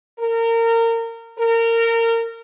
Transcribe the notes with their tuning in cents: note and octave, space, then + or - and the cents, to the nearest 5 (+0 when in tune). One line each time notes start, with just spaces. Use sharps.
A#4 -25
A#4 -25